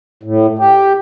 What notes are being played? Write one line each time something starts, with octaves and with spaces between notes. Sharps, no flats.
A2
G4